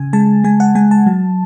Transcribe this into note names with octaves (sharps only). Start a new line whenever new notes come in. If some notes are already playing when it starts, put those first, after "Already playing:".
Already playing: C#3 G#5
G#3 A5
G#3 G#5
F#5
G#3 G#5
A5
F#3